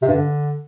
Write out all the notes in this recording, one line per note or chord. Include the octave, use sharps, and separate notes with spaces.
C3
G2
D3